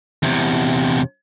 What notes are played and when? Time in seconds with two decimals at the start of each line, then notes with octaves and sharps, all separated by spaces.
0.23 E2 C3